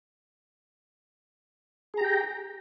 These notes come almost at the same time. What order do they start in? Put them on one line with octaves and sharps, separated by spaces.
G#4 A#5 G4 G5